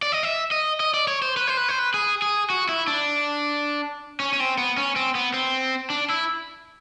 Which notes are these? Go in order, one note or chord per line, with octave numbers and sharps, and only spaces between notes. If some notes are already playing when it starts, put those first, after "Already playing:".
D5
D#5
E5
D#5
D#5
D5
C#5
C5
B4
C5
B4
C5
B4
G#4
G#4
F#4
E4
D4
C#4
C#4
C4
B3
C#4
C4
B3
C4
D4
E4